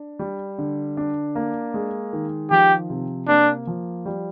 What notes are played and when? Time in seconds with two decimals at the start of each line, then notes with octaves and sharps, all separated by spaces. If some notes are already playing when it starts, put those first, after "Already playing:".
Already playing: D4
0.19 G3
0.58 D3
0.97 D4
1.35 A#3
1.74 G#3
2.13 D#3
2.51 F3 G4
2.90 C3
3.28 A#3 D4
3.67 F3
4.05 G3